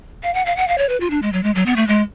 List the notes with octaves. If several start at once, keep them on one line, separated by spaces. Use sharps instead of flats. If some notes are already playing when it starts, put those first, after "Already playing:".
F5
F#5
F5
F#5
F5
C#5
B4
F4
D4
G#3
F#3
G#3
F#3
B3
A3
G#3